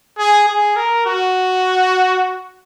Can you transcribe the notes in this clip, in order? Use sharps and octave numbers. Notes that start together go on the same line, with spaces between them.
G#4
G#4
A#4
F#4